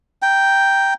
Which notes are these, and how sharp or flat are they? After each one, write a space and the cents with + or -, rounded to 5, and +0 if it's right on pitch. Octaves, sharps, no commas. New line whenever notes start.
G5 +0 A#5 +5